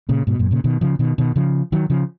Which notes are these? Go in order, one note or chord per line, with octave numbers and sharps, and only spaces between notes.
A#2 C#3
G#2 B2
F#2 A#2
A#2 C#3
B2 D#3
C#3 F3
B2 D#3
B2 D#3
C#3 F3
D#3 F#3
C#3 F3